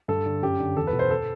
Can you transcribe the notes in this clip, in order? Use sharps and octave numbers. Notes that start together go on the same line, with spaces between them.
G2 A4
D3
F#2 G4
D3
E2 A4
B4
B2
C5
A4